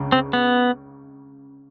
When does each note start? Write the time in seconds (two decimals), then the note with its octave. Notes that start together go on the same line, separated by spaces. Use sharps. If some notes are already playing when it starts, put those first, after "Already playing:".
Already playing: C#2 C#3
0.12 C4
0.33 B3